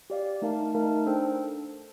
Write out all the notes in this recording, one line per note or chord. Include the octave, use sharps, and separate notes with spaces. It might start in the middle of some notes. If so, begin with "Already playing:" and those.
G4 D5 F5
A3 D#4 A#4 F5 A5
A3 D#4 A#4 F5 A5
D4 A4 C5 G5